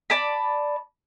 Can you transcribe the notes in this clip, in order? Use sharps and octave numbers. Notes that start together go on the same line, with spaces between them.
D5 A5 B5